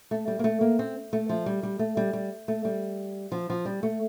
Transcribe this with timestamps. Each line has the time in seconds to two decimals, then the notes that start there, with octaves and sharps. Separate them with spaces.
0.11 A3
0.28 G3
0.39 A#3
0.44 A3
0.61 A#3
0.79 C4
1.13 A3
1.29 F3
1.46 G3
1.63 G3
1.79 A3
1.97 G3
2.13 G3
2.48 A3
2.65 G3
3.32 F3
3.50 F3
3.65 G3
3.83 A3